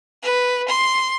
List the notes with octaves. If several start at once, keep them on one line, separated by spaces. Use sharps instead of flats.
B4
C6